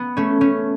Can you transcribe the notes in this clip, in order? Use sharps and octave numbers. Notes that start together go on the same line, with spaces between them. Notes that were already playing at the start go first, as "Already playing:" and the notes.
Already playing: B3
A3 C#4
A3 C#4